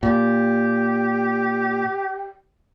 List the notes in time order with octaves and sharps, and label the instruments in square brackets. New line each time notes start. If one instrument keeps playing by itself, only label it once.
[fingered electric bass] A#2 [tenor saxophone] G4